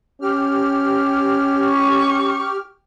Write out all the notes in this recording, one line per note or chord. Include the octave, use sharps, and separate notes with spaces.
C#4 G4 F6
C#6